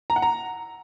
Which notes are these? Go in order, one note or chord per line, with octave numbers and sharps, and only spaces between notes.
A#5
F#5
A#5